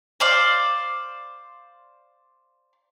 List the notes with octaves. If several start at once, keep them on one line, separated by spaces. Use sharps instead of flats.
C5 D5 F5